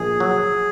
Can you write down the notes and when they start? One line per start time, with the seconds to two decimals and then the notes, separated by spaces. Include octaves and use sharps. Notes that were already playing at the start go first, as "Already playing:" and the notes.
Already playing: A#1 G#4
0.20 F#3